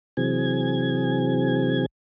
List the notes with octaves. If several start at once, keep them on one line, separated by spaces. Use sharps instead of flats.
C3 E3 F#3 C4 G#4 G#6